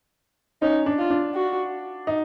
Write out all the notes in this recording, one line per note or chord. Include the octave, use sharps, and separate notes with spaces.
C#4 D#4
D4
F4
D4
F#4
D#4